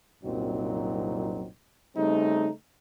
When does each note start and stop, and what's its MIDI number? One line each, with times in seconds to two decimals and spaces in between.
0.24 1.47 36
0.24 1.47 42
0.24 1.47 46
0.24 1.47 54
0.24 1.47 60
0.24 1.47 63
1.96 2.50 49
1.96 2.50 55
1.96 2.50 57
1.96 2.50 60
1.96 2.50 63